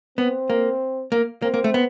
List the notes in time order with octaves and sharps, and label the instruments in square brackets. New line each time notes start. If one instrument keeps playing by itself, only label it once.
[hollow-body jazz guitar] B3 [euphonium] C4
[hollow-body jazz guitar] A#3
A#3
[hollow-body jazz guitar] A#3 [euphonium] C4
[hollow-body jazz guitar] A#3
A3
B3